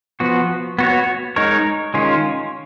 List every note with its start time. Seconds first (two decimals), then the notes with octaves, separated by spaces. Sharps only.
0.20 F3 B3 F#4
0.79 B3 F#4 C#5
1.36 G#3 D#4 A#4 C#5
1.94 D#3 G#3 C#4 F4